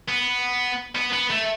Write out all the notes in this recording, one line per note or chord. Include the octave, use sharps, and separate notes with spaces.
B3
B3
B3
A3